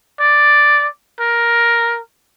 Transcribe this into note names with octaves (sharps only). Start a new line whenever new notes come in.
D5
A#4